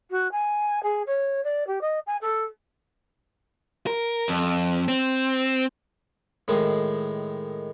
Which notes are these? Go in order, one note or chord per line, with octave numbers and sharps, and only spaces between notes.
F#4
G#5
G#4
C#5
D5
G4
D#5
G#5
A4
A#4
F2
C4
A2 D#3 G#3